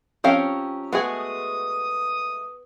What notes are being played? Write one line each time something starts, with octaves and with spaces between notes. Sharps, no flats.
F3 C4 C#4 G4 A#4 F5
G#3 A3 B3 F#4 G#4 D#6